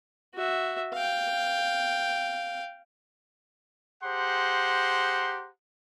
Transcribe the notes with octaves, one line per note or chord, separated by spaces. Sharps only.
F#4 E5
F5 G5
G4 G#4 C5 F#5 A#5 C6